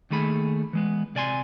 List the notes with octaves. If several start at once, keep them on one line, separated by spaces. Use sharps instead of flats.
D#2 D#3 A3 G#4 B5
E3 G#3 B3
C3 D5 G#5 C6